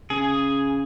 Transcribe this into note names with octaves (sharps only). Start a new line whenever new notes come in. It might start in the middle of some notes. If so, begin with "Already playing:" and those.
C#3 G#4